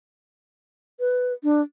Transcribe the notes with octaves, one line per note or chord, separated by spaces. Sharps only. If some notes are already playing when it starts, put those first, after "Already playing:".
B4
D4